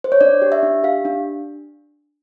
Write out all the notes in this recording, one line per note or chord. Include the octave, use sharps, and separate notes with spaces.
C5
C#5
D4 D5
G4
E5
D4
G4 F5
D4